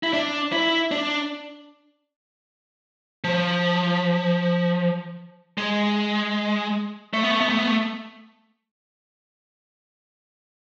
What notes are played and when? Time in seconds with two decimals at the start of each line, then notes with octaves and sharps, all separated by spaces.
0.03 E4
0.13 D4
0.52 E4
0.91 D4
3.24 F3
5.58 G#3
7.13 A3
7.23 B3
7.31 A3
7.41 B3
7.49 A3
7.58 B3
7.67 A3